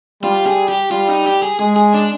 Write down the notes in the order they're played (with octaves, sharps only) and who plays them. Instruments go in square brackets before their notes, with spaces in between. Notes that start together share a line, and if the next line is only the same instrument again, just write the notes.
[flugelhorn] G3 [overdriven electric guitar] F4
[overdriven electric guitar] G#4
G4
[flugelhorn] G3 [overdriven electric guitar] F4
[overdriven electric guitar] D#4
G4
G#4
[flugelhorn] G#3 [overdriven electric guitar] G#4
[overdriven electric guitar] G#4
D4